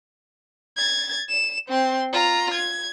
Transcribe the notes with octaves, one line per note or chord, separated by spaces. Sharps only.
G#6 A6
E7
C4 C6
F4 A#5
G#6